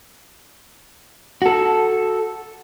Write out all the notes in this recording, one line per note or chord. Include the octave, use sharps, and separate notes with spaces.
F#4 A4